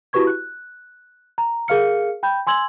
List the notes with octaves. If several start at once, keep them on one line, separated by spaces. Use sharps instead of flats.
E4 F#4 G4 B4 C#6 G#6
F#6
A#5
G#4 A#4 F5 F6 C#7
G5 B5 G6
G#5 C6 E6 G#6 F#7